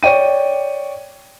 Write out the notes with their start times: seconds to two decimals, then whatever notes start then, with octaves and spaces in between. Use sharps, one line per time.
0.03 C#5 D5 G5 D#7